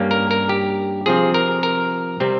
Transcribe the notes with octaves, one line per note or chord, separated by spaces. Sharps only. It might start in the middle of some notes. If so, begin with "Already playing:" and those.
Already playing: G2 G3 A#3 C#4
A#4
A#4
G4
C3 F3 C4 G#4
A#4
A#4
C3 G3 C4